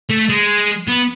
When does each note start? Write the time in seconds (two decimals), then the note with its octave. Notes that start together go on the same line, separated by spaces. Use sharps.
0.10 A3
0.30 G#3
0.88 B3